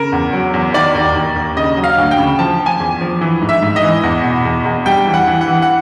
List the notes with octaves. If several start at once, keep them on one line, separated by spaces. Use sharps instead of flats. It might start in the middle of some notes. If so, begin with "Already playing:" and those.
Already playing: C#3 A#4
E2
F#3
E2
D#3 D5
D#2
D#2
D#2
C#3 D#5
F#3
F5
D2
G5
C#3
F3 A5
F3
G#5
E2
F3
E3
G#2
E5
G#2
D#5
E3
E2
B2
E2
E2
G3 G5
E3
F#5
E3
F#5
E3
F#5